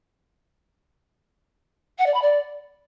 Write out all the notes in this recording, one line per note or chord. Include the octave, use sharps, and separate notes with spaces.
F#5
D5
B5
D5